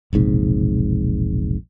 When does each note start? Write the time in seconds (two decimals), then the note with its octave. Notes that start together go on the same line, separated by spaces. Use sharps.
0.13 E1 A#1 G#2 C3